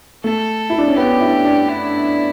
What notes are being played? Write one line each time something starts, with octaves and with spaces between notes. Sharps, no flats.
A3 A4
E4
D4
C#4
B3 G4
E4
D4
E4